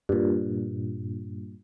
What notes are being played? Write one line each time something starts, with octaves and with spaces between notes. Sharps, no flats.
G2 A#2